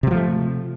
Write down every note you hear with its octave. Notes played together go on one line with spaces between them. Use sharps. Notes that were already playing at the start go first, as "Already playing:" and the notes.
C3 F3 F#3 A3